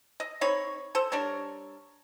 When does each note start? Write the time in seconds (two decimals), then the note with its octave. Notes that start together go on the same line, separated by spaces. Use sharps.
0.20 D#5
0.41 C4 D#4 C#5 B5
0.95 A4 C5
1.12 G3 D4 A#4 C#5